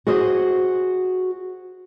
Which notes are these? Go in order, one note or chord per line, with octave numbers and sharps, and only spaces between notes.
F#4 G#4 C5 D#5